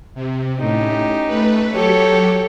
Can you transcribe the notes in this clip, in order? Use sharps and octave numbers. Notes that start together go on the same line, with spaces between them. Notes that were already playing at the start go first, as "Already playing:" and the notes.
C3
A2 C#4 D#4 G4
A3 B4
F#3 G4 A4 C#5